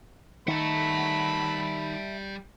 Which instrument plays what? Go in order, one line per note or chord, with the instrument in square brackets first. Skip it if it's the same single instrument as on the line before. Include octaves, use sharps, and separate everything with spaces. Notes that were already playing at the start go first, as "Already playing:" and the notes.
[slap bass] D#3 [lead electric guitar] G3 F#5 [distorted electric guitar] E5 A5 [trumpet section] B5